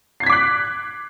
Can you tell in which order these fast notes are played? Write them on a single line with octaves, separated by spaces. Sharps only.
C7 G#6 B6 D6 F#6